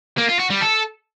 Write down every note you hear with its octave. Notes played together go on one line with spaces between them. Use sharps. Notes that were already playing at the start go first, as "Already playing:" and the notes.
A#3
F4
F#4
G3
A4